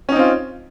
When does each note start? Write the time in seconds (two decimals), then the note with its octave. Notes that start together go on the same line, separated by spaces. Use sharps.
0.09 C#4
0.12 D#4
0.16 C4
0.19 F4